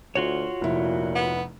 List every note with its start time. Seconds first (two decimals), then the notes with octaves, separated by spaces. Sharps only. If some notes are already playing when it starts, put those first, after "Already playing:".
0.15 D2 F4 F#4 C#5
0.61 F1 A#2 E4
1.15 B3